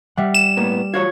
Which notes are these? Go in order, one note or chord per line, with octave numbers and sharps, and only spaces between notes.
G3 E5 F#5
E7
A2 A#3 B3
F4 F#4 C#5 G#6